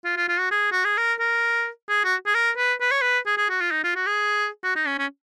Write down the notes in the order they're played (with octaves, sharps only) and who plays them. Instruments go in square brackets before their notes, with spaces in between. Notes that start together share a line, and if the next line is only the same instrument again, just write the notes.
[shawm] F4
F4
F4
F#4
G#4
F#4
G#4
A#4
A#4
G#4
F#4
G#4
A#4
B4
B4
C#5
B4
G#4
G#4
F#4
F4
D#4
F4
F#4
G#4
F#4
D#4
C#4
C#4